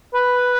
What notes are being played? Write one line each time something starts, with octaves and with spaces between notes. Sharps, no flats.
B4